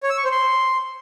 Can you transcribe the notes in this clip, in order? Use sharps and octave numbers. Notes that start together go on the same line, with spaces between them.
C#5
E6
C#6
C5
C6